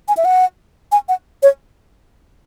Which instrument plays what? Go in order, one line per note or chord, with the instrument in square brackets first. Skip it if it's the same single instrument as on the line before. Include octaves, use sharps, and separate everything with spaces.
[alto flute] G#5
E5
F#5
G#5
F#5
C#5